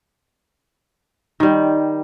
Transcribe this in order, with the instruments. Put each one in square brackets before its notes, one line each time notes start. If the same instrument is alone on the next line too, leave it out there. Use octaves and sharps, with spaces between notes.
[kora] D#3 G3